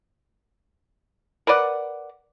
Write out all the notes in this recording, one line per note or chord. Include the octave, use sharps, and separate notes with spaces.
A#4 B4 D5 F#5